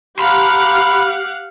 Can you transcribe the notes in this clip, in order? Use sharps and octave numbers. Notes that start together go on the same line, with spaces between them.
G4 F5 F#5 B5 C6